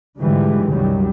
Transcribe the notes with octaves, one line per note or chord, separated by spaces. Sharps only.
G#2 D3 E3 F3 G3 G#3
C2 F#2 D#3 F#3 G3